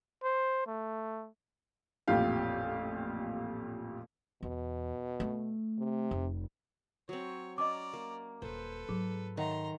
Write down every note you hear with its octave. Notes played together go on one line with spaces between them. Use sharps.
C5
A3
A1 F2 A#2 F4 G4 F5
E2 B2
A3
C3
F1
F#3 C4 C#5
C#4 D5 D#5 A5 A#5 D6
A#3
D#1 A4 B4 C5
G#2 F#3 G#4
D#3 C#5 E5 F#5 A#5 C6